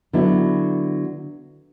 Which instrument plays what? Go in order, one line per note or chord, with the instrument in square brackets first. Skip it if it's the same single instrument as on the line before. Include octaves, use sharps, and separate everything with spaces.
[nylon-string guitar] D3 F#3 B3 E4